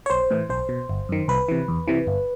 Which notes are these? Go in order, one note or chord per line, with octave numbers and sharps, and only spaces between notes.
C#5
B1 C5
A2 E3
B1 C5
B2
G1
F#2 D#3
C2 B4
C3 E3
E2
C3 E3
G1